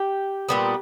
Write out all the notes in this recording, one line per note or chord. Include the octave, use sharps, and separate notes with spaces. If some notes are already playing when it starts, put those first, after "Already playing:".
Already playing: G4
A#2 G3 B3